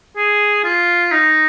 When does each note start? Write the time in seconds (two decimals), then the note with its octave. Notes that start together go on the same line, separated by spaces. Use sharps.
0.16 G#4
0.64 F4
1.11 D#4